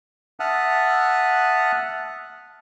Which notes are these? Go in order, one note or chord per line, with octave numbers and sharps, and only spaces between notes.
E5 F#5 A5 D#6 F6 F#6